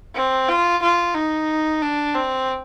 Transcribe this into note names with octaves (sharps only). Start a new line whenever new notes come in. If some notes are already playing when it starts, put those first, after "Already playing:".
C4
F4
F4
D#4
D4
C4